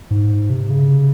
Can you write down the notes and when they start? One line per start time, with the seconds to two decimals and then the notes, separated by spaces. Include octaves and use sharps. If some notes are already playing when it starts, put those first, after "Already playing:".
0.11 G#2
0.50 C3
0.70 C#3